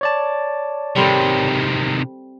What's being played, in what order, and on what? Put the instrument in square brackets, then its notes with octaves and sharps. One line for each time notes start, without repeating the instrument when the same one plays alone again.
[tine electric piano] C#5 D5 A5
[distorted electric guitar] C3 D#3 [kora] G3 C4 A4